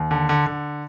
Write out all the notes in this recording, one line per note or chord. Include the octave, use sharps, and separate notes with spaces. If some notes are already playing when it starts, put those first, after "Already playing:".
Already playing: D#2
D3
D3
D3